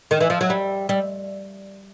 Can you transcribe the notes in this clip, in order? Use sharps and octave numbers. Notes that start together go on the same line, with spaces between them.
D#3
E3
F3
F#3
G3
G3